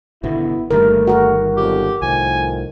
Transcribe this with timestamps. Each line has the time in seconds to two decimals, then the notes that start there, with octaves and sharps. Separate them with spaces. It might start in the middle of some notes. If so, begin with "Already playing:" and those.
0.23 G#1 B2 D3 B3 E4
0.71 G1 D#2 D#3 G3 A3 A#4
1.08 F#4 A#4
1.57 B1 F2 G4
2.02 C2 A2 D#3 F3 G#5